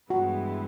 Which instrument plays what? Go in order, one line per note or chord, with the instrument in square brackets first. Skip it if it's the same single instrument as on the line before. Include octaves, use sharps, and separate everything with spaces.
[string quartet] G2 E3 G#3 B3 E4 [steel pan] F#4